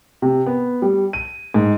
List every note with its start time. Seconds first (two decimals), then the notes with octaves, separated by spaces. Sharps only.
0.22 C3
0.46 B3
0.82 G3
1.13 D#7
1.54 G#2